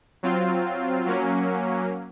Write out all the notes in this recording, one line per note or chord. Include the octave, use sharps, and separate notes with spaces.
F#3 C4 F4
F#3 A#3 C#4